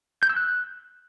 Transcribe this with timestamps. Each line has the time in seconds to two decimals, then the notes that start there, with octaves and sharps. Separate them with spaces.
0.23 G6
0.30 E6
0.36 F#6